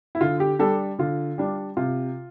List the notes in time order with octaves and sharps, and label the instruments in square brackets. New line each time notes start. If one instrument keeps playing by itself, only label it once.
[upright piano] E4
D3 F4
G4
G3 D4 A4
D3 F4
G3 D4
C3 F4